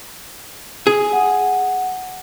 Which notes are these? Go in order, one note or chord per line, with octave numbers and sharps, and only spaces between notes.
G#4
F#5